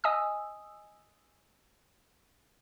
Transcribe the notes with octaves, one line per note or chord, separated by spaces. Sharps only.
D#5 G#5 D#6 E6